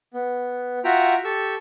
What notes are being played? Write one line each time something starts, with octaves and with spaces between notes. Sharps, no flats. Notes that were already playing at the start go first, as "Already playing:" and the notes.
B3
F4 F#4 E5 F#5 G5 A#5
G4 A4 C#6 E6